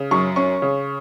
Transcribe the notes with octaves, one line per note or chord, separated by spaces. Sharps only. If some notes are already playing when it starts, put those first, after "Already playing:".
Already playing: C#3
F#2 C#6
C#4 C#6
C#3